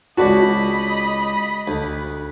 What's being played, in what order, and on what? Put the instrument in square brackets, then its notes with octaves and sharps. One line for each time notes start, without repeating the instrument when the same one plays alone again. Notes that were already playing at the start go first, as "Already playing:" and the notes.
[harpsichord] C#2 D5 A5 [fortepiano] F#4 [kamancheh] D#5 B5
[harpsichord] D2